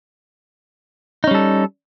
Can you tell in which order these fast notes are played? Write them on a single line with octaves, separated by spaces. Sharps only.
D#4 C#4 G3 A4